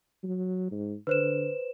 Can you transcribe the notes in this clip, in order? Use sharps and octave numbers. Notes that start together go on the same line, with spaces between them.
F#3
G#2
D3 B4 C5 E7